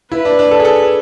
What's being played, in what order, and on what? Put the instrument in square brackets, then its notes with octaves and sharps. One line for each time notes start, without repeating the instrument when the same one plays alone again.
[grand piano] E4 [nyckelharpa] B4
[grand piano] D4
D4
A4
G#4
A4